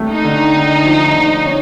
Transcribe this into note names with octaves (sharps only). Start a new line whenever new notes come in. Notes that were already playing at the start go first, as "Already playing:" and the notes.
Already playing: D#2 A3
D#4
D3
D3
F3
D3
C#4